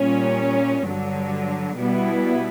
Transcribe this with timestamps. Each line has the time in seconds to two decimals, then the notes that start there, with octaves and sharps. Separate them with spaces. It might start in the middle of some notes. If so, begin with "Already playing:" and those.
Already playing: A#2 G3 C#4
0.84 G2 D3 F#3
1.75 B2 G3 B3 E4